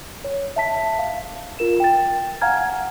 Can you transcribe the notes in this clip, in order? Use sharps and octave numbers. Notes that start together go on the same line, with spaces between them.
C#5
E5 A5 B6
F5
F4 A#4 E7
G5 A6
F5 F#5 G#5 A#5 F6 G#6